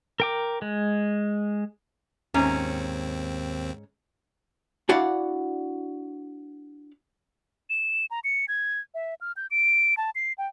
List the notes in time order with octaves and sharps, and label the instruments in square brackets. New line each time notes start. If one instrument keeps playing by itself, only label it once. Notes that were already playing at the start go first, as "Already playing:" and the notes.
[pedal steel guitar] A#4 G5 D6
G#3
[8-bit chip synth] D#2 C4 [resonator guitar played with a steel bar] G#2 C#4 A#5
[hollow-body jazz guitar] D4 E4 F#4 D5 F5 F#5
[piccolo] E7
A#5
C#7
G#6
E5
F6
G6
D7
A5
C7
G5